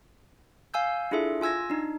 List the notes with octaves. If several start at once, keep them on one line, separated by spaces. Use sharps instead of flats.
F5 G#5 E6 G6
D4 E4 F4 G#4 A4 E5
F4 G#5 E6 G#6 A#6
D4 D#4